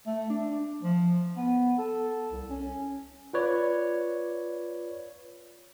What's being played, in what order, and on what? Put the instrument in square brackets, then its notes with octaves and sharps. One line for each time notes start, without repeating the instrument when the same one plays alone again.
[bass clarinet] A3
D4
F3
B3
A4
C2
C#4
[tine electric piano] F4 B4 C#5 D5